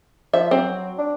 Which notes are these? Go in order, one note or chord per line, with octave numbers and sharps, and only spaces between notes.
F3 E5
F#3 C4
D4